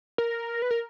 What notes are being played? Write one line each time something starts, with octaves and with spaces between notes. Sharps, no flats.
A#4
B4
A#4